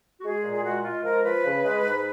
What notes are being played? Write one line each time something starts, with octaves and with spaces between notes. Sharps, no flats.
F#4
G#3 G#4
A#2
G#4
G#3 F#4
G#3 F4
F3 A#4
F3 B4
C#3
G#3
G#2